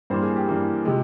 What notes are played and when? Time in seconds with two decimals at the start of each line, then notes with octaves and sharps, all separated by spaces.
0.10 G2 E3 A#3 C5
0.22 G#4
0.36 G4
0.48 G2 E3 A#3
0.85 C3 F3 G#3